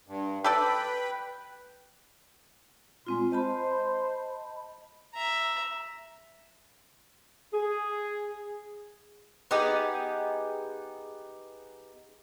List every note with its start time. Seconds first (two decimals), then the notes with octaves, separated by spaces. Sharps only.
0.08 G2
0.44 G4 A4 B4 D5 G5 B5
3.07 A#2 G#3 C4 F4 C6
3.32 C5 D#5 A5 B5
5.14 E5 A#5
7.53 G#4
9.51 B3 D#4 G4 G#4